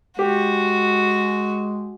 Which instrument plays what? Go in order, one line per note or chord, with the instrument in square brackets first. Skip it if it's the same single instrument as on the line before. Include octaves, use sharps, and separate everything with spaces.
[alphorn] G#3 [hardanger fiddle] F#4 [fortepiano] G4